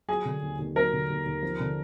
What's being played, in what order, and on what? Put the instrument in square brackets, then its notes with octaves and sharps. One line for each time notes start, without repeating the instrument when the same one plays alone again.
[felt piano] F#3 [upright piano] G#4
[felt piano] D3
D#2
D#2
[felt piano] F#3 [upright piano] A#4
[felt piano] D3
D#2
D#2
F3
D3